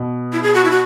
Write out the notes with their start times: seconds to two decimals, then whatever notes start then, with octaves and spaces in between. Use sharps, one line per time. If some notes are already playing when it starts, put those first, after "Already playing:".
Already playing: B2
0.33 E4
0.43 G#4
0.54 F#4
0.65 E4
0.71 F#4